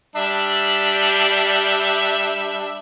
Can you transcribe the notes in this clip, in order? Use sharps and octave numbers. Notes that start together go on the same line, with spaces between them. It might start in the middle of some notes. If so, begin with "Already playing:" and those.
G3 D4 E5